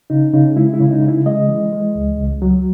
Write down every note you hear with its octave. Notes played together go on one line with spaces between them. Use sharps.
C#3 D#4
C#3 D#4
G#3 E4
E4
C#3
D#4
C#3
E4
G#3 D#5
E3
G#3
C#2
C#2
F#3